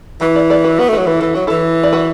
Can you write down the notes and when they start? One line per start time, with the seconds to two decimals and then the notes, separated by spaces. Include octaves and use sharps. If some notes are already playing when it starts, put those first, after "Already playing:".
0.21 E3 F#4 B4
0.35 A4 D5
0.50 A4 D5
0.64 F#4 B4
0.78 B3 F#4 B4
0.88 A3
0.93 F#4 B4
0.98 F#3
1.07 E3 B4
1.20 E3 A4
1.34 F#3 F#4
1.47 E3 E4 A4
1.83 D5
1.93 F#4 B4